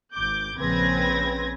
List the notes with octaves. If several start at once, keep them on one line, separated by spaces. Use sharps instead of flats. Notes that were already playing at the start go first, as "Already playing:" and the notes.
G#1 D6 G6
A#1 C#3 C4 B4 G#6 A#6